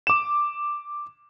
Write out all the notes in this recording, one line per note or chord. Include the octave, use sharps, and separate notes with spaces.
D6 E7